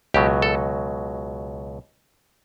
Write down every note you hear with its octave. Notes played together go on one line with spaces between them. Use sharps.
C#2 B2 F#3 G4
A4